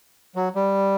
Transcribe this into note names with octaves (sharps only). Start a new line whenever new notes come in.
F#3
G3